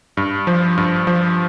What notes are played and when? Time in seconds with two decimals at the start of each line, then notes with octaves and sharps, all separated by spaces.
0.17 G2
0.47 F3
0.77 G2
1.07 F3